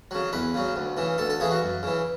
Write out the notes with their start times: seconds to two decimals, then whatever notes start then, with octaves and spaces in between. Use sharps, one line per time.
0.11 C#3 F#3
0.33 E2 B4
0.54 C#3 F#3
0.76 D2
0.97 C#3 E3
1.18 D2 A4
1.30 A4
1.40 C#3 E3 G#4
1.51 F#4
1.62 F#2
1.83 C#3 E3